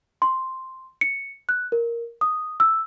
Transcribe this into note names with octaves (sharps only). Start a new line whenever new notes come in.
C6
C#7
F#6
A#4
D#6
E6